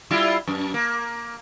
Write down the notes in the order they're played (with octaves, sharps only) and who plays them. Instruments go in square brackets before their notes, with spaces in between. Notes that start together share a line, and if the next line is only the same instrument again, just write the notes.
[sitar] G3 E4 F4
F#2
A#3